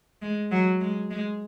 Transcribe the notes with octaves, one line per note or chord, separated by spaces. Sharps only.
G#3
F#3
G#3
G#3